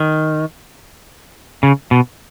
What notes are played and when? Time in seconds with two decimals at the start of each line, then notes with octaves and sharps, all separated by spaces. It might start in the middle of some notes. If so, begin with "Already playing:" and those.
Already playing: D#3
1.63 C#3
1.91 B2